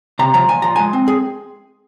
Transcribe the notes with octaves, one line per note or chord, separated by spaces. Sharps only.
C3 A#5
F3 A#5
A#2 G#5
F3 A#5
G#3 G#5
C4
G#4